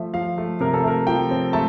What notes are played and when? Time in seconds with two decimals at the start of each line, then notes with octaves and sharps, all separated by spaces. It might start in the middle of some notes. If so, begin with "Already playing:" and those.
Already playing: F3 A3 E5
0.14 F3 F5
0.38 A3
0.60 C3 A#4
0.74 A4
0.84 A3 A#4
1.07 F3 G5
1.31 C4
1.53 A3 A5